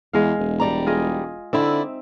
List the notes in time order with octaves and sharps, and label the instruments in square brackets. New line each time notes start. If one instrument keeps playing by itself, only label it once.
[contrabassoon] E2 [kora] G#3 F5
[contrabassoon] E1
[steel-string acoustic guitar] G3 D5 A#5
[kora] F4 G#4 D#5
[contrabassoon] D3 [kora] C4 D#4 E5 [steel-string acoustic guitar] E4 D5